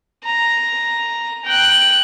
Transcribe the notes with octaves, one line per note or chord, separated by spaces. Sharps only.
A#5
G5 F#6